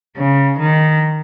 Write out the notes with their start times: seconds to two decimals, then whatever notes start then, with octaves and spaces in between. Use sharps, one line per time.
0.17 C#3
0.59 D#3